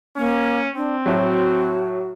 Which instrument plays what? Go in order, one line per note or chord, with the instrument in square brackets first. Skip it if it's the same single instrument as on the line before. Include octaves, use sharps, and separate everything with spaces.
[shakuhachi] A#3 [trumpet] C#4
[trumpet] C4 [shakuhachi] D4
[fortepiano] A2 F#3 [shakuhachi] F#4